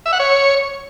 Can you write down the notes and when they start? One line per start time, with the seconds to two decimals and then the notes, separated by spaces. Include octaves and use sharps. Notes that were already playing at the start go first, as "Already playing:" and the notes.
0.06 E5
0.13 F#5
0.20 C#5